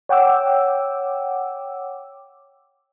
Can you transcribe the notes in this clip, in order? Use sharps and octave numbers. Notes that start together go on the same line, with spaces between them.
C#5 F#5 G5 D6 E6